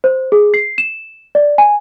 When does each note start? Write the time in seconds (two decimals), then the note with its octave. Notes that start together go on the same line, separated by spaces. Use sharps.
0.04 C5
0.32 G#4
0.54 C7
0.78 E7
1.35 D5
1.58 G#5